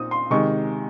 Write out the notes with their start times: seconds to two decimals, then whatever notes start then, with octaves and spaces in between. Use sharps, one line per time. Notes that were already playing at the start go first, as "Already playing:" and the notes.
Already playing: A#2 C4 D#4 D#6
0.11 C6
0.30 C3 D#3 G#3 C#6